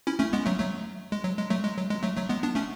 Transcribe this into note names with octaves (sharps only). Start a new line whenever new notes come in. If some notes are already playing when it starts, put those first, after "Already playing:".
C#4 E4
A3 C#4
G#3 B3
F#3 A3
F#3 A3
G#3
F#3
G#3
F#3 A3
G#3
F#3
G#3
F#3 A3
F#3 A3
G#3 B3
B3 D4
A3 C#4